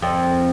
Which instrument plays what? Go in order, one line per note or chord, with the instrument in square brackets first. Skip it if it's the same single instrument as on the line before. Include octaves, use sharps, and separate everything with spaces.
[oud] F2